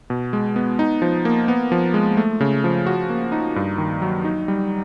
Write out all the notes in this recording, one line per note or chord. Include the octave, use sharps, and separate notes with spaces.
B2
G#3
B3
D#4
F3
A#3
B3
F3
G#3
A3
C#3
F3
F#4
A#3
D#4
G2
D#3
F#3
D#4
G3